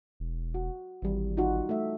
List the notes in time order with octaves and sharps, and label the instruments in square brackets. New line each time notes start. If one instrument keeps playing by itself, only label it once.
[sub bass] E1
[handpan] F#4
[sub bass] G#1 [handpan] E3 G3
[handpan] D#4 F4 F#4
A3 E5